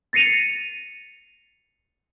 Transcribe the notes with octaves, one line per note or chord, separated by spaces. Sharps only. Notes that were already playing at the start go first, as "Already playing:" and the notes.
A6 A#6 C7 C#7 D#7 F7